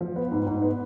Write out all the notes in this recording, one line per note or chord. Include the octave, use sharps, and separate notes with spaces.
F3
B3
G#2
G#2
B3